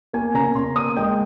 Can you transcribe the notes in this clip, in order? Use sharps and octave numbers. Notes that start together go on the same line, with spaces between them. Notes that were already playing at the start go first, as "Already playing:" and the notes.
A#3 G#5
C#3 A#5
C#3 C6
A#3 D#6
G#3 G5